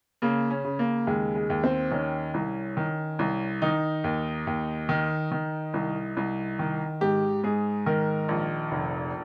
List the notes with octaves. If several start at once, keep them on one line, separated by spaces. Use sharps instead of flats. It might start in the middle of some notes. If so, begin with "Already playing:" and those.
C#3 A#3
C#4
C#3
A#3
D#2 G#3
G#3
D#2
C4
D#3 C#4
C2
D#3
C2
D#3 D#4
D#2
D#2
D#3
D#3
C2
C2
D#3
G#2 G4
G#2 G#4
D#3 A#4
A#1
F1